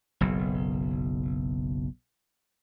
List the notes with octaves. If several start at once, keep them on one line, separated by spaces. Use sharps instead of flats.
F#1 B1